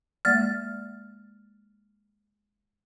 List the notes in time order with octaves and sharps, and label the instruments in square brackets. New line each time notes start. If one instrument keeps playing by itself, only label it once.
[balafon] G#3 A#3 D5 [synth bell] F6 A6